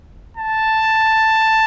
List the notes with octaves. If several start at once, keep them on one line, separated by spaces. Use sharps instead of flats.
A5